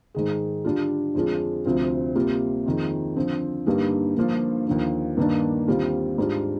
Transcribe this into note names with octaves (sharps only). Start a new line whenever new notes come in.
G#2 D#3 G#3
D3 G3 D4 F4
F2 D3 G#3 D4 F4
D2 C3 F3 C4 F4
C3 G3 A#3 F4
F2 D#3 G#3
D3 F3 C4
G2 D3 G3 A#3 D#4
G2 D3 F3 A#3 F4
D#2 D3 F3
G2 D#3 A#3 D4
D#2 D3 G3 C4 F4
G#2 G3 D4 F4